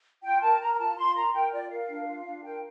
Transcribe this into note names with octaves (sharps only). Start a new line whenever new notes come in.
F4 G5
A#4 A5
A#4 A#5
A#5
F4 A5
F4 C6
A#4 A#5
A#4 G5
F4 D5
A#4 F5
D4
F4
D4
A#4 G5